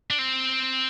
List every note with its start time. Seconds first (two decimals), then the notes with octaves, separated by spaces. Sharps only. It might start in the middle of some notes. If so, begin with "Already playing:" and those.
0.10 D4
0.19 C4